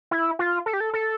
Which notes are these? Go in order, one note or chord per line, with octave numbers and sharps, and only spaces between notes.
E4
F4
A4
G4
A4
A4